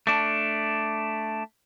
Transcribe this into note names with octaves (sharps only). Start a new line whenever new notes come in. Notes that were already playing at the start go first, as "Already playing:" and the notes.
A3 D4